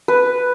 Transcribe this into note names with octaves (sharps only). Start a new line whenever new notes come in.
B4